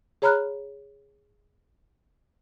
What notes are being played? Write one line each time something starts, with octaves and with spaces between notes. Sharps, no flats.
G#4 C#5 A#5 B5 F6 F#6